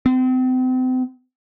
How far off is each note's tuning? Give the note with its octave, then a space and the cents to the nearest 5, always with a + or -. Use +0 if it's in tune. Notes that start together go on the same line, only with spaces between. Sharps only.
C4 -35